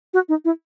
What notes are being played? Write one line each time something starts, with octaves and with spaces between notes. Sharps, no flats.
F#4
D#4
E4